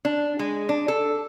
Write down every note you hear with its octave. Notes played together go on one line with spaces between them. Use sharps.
D4
G#3
D4
A4